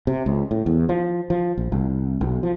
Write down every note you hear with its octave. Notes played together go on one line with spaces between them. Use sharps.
C3
C#2
A2
E2
F3
F3
A#1
C2
B1
F3